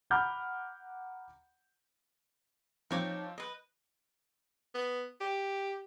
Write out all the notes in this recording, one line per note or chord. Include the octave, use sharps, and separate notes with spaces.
F#5 A#5 B5 D6 F6 G6
F3 C4 D#4 C#5 D6 G6
B4 D#5
B3
G4